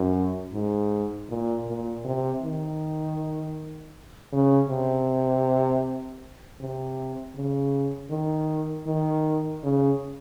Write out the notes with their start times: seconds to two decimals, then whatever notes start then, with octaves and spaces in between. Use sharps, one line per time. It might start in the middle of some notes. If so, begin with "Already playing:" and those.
Already playing: F#2
0.53 G#2
1.29 A#2
1.67 A#2
2.05 C3
2.43 D#3
4.33 C#3
4.70 C3
6.60 C3
7.36 C#3
8.11 D#3
8.87 D#3
9.64 C#3